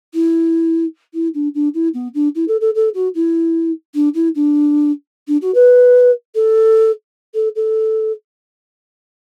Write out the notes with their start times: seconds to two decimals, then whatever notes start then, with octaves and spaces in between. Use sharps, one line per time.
0.14 E4
1.13 E4
1.34 D4
1.54 D4
1.74 E4
1.94 B3
2.14 D4
2.35 E4
2.48 A4
2.61 A4
2.75 A4
2.94 F#4
3.14 E4
3.94 D4
4.14 E4
4.35 D4
5.27 D4
5.41 F#4
5.54 B4
6.35 A4
7.34 A4
7.55 A4